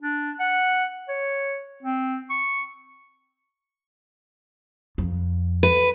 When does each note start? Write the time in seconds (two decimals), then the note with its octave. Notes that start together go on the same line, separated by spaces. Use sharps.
0.02 D4
0.40 F#5
1.08 C#5
1.83 C4
2.30 C#6
4.98 F2
5.63 B4